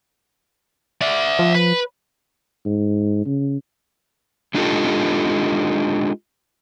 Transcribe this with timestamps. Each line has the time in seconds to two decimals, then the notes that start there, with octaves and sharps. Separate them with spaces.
1.01 D5 E5
1.39 F3
1.55 B4
2.65 G#2
3.26 C#3
4.54 G#3 D4 D#4 F4 G4 A4